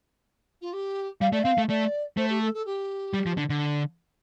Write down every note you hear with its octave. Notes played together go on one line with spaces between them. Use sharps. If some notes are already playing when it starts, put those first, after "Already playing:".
F4
G4
G3 F5
A3 D5
C4 F5
A3
A3 D5
A3 C5
G4
A4
A4
G4
G3
F3
D3
D3